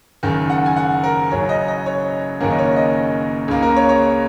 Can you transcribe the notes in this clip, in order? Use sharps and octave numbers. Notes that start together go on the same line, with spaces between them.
F#1 F#2 D#3
F#5
G#5
F#5
A#4
F#1 F#2 F#3 C#5
D#5
D#5
C#5
F#1 F#2 D#3 A#3 C#4 A#4
D#5
C#5
D#5
C#2 C#3 A#3
A#4
C#5
C#5